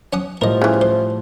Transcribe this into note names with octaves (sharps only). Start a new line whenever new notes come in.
C#4 F#5 D#6
A2 F3 G3 A#4 D#5
C#3 E3
C5